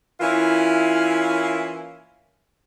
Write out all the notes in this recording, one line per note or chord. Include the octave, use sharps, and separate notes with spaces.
E3 A#3 C#4 E4 F4